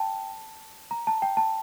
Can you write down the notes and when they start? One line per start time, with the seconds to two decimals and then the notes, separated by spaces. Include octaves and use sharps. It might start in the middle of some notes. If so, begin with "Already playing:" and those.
Already playing: G5 A5
0.91 A#5
1.07 A5
1.22 G5
1.37 A5